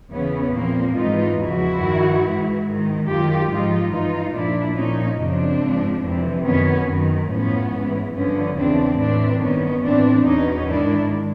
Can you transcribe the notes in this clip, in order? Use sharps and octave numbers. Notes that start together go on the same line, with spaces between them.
E2 C#3 E3 B3 C#4
A#2 F3 A#3 C4
G#2 E3 D#4 F4
E2 C#3 F3 E4 F#4
G2 D#3
G#2 E3
G#2 D#3
F#2 D#3 F4 G4
G#2 F3 D#4 F4
G2 E3 D#4 F4
A#2 F3 D4 E4
A#2 F3 C#4 D#4
F#2 C#3 F3 C4 D4
G#2 F3
F2 C3 E3
F#2 D#3 B3 C#4
F#2 D#3
A2 F3 B3 C#4
G#2 E3
G2 D3 F3 B3 C#4
E2 C#3 E3 C4 D4
A2 E3 C4 D4
G2 D#3 B3 C#4
A2 E3 C4 D4
E2 B2 C#4 D#4
G#2 D#3 D4 E4